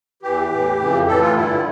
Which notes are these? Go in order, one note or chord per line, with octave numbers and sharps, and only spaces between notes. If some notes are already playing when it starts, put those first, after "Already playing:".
E2 E3 G4
A2 E3
F2 C#3 E3
A2 E3 A4
F4
G2 D3 E4